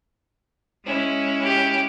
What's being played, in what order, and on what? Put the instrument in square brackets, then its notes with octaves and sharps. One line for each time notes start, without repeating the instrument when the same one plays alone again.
[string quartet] G#3 C#4 E4
[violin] G4